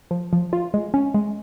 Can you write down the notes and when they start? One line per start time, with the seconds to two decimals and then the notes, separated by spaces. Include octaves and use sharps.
0.11 F3
0.33 F3
0.53 F4
0.74 G#3
0.94 C#4
1.14 G#3